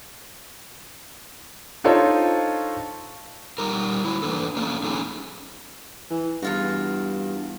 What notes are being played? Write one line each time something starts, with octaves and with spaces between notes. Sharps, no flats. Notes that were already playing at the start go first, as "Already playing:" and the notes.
D4 D#4 F4 A4 C5 C#5
G3 D#4 G4 A#4
F#3 E4
E3 A#3 D4 A4
A3 A#3 C#4 D4
F#3 C#4 D#4 G#4 A4 C#5
E3
E2 G2 F4 F#4